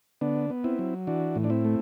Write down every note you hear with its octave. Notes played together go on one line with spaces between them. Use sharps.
D3 B3 D4
B3
C4 E4
F#3
E3 D4 F#4
A2
D4
C4 E4
A3